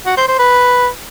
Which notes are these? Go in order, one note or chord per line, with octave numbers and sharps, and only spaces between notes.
F#4
C5
C5
B4